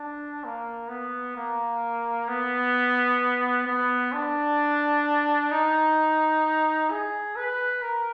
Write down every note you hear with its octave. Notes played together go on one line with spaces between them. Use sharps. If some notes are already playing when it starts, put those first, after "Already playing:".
Already playing: D4
A#3
B3
A#3
B3
B3
D4
D#4
G#4
B4
A#4